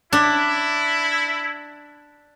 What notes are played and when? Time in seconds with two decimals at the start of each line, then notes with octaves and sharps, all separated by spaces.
0.13 D4 E4